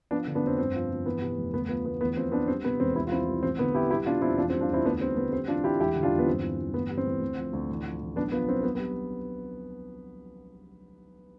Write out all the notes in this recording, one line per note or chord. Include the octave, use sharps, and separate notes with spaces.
F3 B3 D4
D3
B3 D4
F1 C4
G1 C4
F3
G1
E3 B3
C3
F1
D2 B3
F3 B3
D2 B3
E2 B3
F3 C4
E2 B3 D4
G3 C4
C3 B3
E1 C4
C2 C4 E4
F4
F3 C4 E4
C2
A1 C4
D3 B3
A1 E4 G4
G3 E4 G4
B2 D4 F4
F1 C4 E4
E2 D4 F4
C4
G3
D4 F4
E2 C4 E4
D2 B3 D4
G3 C4
D2 B3
G3 C4
E3 D4 F4
A1 E4 G4
E1 E4 G4
D3
D4 F4
E1
B3
G1 C4
E3
G1
A1 B3
G3
C4
A1
D2
F3
D2
A1
F3
A1
B1 B3 D4
F3 B3
B1 C4
B1 B3
B3
G3